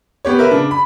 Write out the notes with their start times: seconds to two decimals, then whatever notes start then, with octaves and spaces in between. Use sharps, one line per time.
0.25 B3 G4 C#5
0.39 A#4 B4 E5
0.51 C#3 D4
0.71 B5